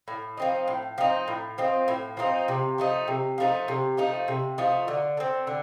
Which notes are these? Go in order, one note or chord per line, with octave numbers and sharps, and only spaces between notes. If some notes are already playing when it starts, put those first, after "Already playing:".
A2
F3 C4 D#4
A2
F3 C4 D#4
A2
F3 C4 D#4
A2
F3 C4 D#4
C3
F3 A3 D#4
C3
F3 A3 D#4
C3
F3 A3 D#4
C3
F3 A3 D#4
D3
A3 C4
D3